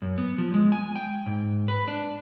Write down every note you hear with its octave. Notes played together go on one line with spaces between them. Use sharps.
F#2
B3
F3
G#3
G#5
G5
G#2
B4
D4